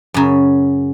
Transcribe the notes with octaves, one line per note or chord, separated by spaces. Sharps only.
F#2 C#3